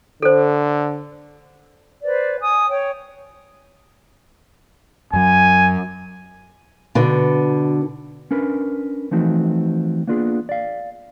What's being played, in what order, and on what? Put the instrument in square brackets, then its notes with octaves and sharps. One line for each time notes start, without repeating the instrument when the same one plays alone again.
[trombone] D3 [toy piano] A4 C5
[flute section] B4 C5 D5
G#5 D#6
C#5 G5
[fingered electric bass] F#2 F#3 [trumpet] G#5
[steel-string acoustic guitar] B2 D3
[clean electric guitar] C#4 D4 A#4 B4
E3 F3 A3 C4 D#4 F#4
A#3 B3 D4 F4 F#4 G#4
D5 F5